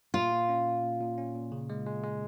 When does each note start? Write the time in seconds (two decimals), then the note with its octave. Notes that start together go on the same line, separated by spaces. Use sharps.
0.14 A#2 F4
0.31 A#2
0.49 C#4
0.66 A#2
0.84 A#2
1.01 A#2
1.18 C#4
1.35 A#2
1.52 C#3
1.70 G#3
1.87 G#3
2.04 G#3